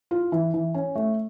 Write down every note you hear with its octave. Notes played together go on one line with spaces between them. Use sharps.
F4
E3
E3
C#4
A3